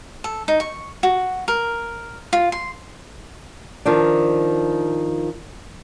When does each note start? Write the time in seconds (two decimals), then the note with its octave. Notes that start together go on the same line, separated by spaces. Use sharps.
0.24 A4
0.48 D#4
0.60 C#6
1.03 F#4
1.48 A#4
2.33 F4
2.52 C6
3.85 D#3 F3 D4